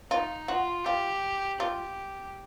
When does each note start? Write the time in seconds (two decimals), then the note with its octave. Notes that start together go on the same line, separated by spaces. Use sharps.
0.11 D#4 F4
0.48 F4 F#4
0.85 F4 G4
1.60 F4 G4